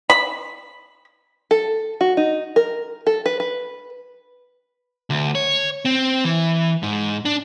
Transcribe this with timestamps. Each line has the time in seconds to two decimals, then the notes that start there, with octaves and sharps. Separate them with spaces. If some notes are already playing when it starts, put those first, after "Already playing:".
0.10 B5
1.51 A4
2.01 F#4
2.17 D#4
2.56 A#4
3.07 A4
3.26 B4
3.40 B4
5.10 D2
5.35 C#5
5.85 C4
6.25 E3
6.83 G#2
7.25 D4